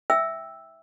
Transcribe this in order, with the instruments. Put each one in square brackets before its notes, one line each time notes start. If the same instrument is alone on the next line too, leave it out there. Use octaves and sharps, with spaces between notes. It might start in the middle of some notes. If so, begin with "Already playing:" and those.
[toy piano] E5 G5 E6